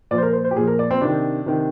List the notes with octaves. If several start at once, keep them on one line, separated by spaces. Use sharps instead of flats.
A#2 F3 D5
C5
A#4
C5
C5
G4
A#2 F3 G#4
A#4
D5
C4
C3 D#3 D4
C3 D#3